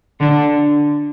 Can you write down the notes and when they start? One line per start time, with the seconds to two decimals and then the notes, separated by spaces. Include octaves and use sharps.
0.20 D3